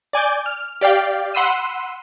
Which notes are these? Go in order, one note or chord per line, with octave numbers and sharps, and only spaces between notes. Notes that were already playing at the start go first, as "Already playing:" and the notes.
D5 G#5 D6 G6
F6
G4 D5 F5 G5
F#5 B5 C6 E6 D#7